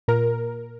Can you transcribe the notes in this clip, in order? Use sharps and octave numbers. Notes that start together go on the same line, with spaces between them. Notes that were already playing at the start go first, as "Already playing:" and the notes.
A#2 A#4